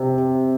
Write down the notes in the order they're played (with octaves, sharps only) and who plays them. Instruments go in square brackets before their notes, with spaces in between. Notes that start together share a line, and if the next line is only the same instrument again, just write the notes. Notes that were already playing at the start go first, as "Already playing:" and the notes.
Already playing: [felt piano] C3